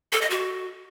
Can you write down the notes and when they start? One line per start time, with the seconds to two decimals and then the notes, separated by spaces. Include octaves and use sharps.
0.12 A4
0.21 D#5
0.30 F#4